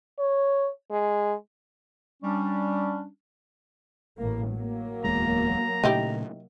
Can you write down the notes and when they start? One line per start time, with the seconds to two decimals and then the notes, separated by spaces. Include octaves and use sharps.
0.19 C#5
0.91 G#3
2.22 G3 C#4 D4
4.18 A1 A2 A#3
4.51 F#3 A#3
5.04 D1 E2 G#3 A#5
5.84 A#2 C#3 A3 D#4 E4 G4